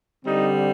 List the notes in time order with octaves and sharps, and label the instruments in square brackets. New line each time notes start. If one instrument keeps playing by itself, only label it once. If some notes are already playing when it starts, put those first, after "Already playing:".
[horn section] D3 G3 C4 D#4